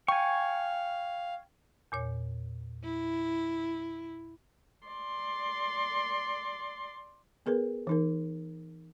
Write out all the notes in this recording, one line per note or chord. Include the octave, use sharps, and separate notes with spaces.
F5 G5 G#5 C#6
E2 A#2 C#5
E4
D5 C6
B3 G#4 A#4 B4
E3 D#4 A#4